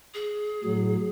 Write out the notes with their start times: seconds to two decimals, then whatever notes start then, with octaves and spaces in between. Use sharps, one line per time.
0.14 G#4
0.64 A2 F#3